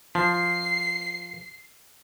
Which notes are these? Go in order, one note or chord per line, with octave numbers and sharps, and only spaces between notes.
F3 C7